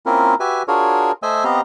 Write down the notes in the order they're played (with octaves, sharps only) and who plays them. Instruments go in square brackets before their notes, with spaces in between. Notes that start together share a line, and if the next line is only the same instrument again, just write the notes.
[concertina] A#3 C4 C#4 E4 F4 A#4
F#4 G4 B4 E5 G#5
D4 F4 F#4 G#4 A#4 C#5
A3 C5 D#5 E5 G#5 E6
B3 C4 G4 D#5 F5 A#5